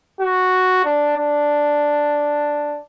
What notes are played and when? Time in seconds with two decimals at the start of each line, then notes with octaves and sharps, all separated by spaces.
0.21 F#4
0.85 D4
1.17 D4